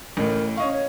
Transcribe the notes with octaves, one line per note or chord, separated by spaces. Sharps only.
A1 A2 A#4
C#4 D#5 F5 C#6
C#5